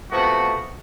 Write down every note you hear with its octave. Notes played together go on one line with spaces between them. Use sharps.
C3 A3 B3 F4 F#4